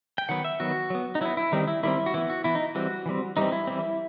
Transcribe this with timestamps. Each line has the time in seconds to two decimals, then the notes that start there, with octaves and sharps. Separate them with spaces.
0.18 G5
0.29 D#3 F#3 B3 F#5
0.45 E5
0.60 D#3 F#3 B3 F#4
0.90 F#3 B3
1.15 D#4
1.21 F#3 B3 E4
1.37 E4
1.52 D#3 G3 C4 D#4
1.68 E4
1.83 D#3 G3 C4 E4
2.06 F#4
2.14 E3 B3 E4
2.30 F#4
2.44 E3 B3 E4
2.55 D#4
2.75 E3 G3 C4 F#4
3.06 E3 G3 C4
3.37 E3 G3 C4 D#4
3.52 E4
3.67 E3 G3 C4